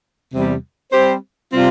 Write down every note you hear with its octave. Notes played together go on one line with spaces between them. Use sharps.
E2 C3 G3
G3 C4 G4 C5
C3 G3 C4 F4